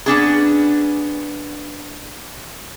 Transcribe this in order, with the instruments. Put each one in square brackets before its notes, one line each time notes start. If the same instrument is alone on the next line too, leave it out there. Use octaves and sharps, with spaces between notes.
[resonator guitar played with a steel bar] B3 C#4 D4 G#4